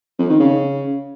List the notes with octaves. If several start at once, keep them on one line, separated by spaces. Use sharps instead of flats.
F2
D#3
C#3